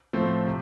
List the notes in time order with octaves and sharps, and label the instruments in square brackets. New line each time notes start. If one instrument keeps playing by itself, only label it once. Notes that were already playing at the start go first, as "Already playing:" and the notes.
[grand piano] A2 F3 A3 C4
C3